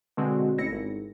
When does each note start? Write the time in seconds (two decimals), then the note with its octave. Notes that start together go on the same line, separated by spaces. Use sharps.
0.17 B2 D3 G#3 C4 F#4
0.58 A1 E4 A#6 C#7
0.72 G#1